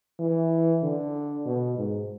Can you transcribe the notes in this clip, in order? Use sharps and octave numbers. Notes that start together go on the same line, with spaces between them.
E3
D3
B2
G#2